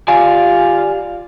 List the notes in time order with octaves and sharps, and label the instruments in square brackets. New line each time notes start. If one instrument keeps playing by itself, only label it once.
[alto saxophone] F4 [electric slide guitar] G4 D5 G#5